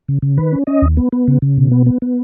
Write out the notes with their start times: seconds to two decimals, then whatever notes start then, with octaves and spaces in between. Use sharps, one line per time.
0.08 C#3
0.22 C#3
0.37 D#3 B4
0.52 C#4
0.67 C#4 D#5
0.82 D#2
0.97 B3
1.12 B3
1.28 C#3
1.42 C#3
1.57 B2
1.71 B3
1.86 B3
2.02 B3